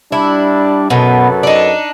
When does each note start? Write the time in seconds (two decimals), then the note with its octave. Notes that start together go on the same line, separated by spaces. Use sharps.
0.12 G3 D4 E4
0.90 F#2 B2 B3 A4 B4
1.43 D4 D#4